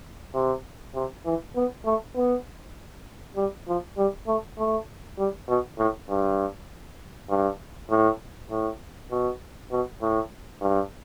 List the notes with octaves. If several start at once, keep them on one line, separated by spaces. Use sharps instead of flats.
C3
C3
E3
B3
A3
B3
G3
F3
G3
A3
A3
G3
B2
A2
G2
G2
A2
A2
B2
B2
A2
G2